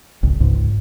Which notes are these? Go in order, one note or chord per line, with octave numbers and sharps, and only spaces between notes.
G#1 C#2
C#2 G#2